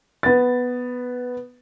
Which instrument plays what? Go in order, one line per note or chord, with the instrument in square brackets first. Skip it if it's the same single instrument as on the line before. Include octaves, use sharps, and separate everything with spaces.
[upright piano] B3 A6